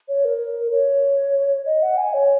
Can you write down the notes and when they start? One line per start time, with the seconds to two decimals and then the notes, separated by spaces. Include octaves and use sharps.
0.09 C#5
0.25 A#4
0.72 C#5
1.66 D#5
1.83 F#5
1.98 G#5
2.13 C#5